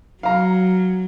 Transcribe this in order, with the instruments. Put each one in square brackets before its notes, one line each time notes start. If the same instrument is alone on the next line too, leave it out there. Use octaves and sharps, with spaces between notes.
[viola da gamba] F#3 [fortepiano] F5 A#5